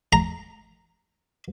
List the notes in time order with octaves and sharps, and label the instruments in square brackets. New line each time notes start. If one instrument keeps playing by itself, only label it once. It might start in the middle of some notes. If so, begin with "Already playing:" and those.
[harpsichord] A#5